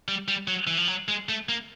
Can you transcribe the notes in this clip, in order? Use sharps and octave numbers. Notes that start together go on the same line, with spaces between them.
G3
G3
F#3
E3
F3
F#3
G#3
A3
A#3